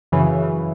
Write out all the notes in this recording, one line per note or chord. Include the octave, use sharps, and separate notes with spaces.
F#2 C#3 E3